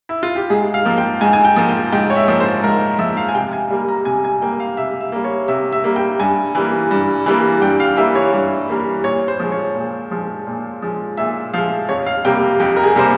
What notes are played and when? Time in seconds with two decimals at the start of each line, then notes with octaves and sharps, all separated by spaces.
0.09 E4
0.23 F4
0.36 G4
0.50 G#2 G#4
0.74 F5
0.85 F3 A#3
0.98 G5
1.21 G#2 G#5
1.33 G#5
1.45 G5
1.56 F3 A#3
1.69 G5
1.92 G#2 G5
2.10 C#5
2.16 E5
2.28 F3 A#3
2.40 C5
2.63 G#2 A#4
2.99 F3 A#3 E5
3.17 F5
3.29 G#5
3.35 C3 G5
3.53 G#5
3.70 G3 A#3
3.88 A#5
4.05 C3 G#5
4.24 G#5
4.41 G3 A#3 G5
4.60 F5
4.77 C3 E5
5.01 E5
5.12 G3 A#3
5.24 C#5
5.48 C3 E5
5.73 E5
5.84 G3 A#3
5.96 G5
6.19 G2 G#5
6.55 E3 G3 A#3
6.91 G2
7.26 E3 G3 A#3
7.62 G2 G5
7.80 F5
7.97 E3 G3 A#3 E5
8.15 C#5
8.33 G2
8.69 E3 G3 A#3
9.04 A#2 C#5
9.28 C5
9.39 F3 G#3
9.52 C#5
9.75 A#2
10.11 F3 G#3
10.47 A#2
10.82 F3 G#3
11.17 A#2 E5
11.54 F3 G#3 F5
11.89 F2 C#5
12.06 F5
12.25 C3 G3 A#3 G5
12.60 F2 G5
12.77 A#4
12.84 G#4
12.96 C3 G3 A#3 C5